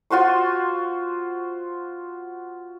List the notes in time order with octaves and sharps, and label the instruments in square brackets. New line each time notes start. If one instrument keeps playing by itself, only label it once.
[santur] F4 F#4 C5 C#6